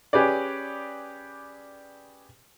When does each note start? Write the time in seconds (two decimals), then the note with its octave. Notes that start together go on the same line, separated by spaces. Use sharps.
0.13 C#4 G4 G#4 B4 D5